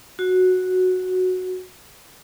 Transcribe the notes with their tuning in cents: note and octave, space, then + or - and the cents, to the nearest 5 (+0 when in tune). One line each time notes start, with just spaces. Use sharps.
F#4 -5